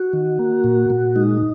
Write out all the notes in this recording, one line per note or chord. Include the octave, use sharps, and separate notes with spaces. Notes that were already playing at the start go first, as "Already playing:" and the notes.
Already playing: F#4
D#3
A#3
A#2
A#2
G#3 D#4